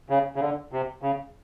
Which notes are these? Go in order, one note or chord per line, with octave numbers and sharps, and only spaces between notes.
C#3
C#3
D3
C3
C#3